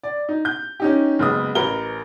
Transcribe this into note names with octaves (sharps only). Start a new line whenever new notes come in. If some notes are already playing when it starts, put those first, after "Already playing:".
D5
D#4
G6
C#4 D#4 G4
F#1 G#3 B3 D#6
A1 A#4 B4 G7